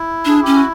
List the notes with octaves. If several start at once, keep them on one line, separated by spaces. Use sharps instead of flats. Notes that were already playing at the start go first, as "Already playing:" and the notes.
Already playing: E4
D4 G#4
C#4 G4
F#4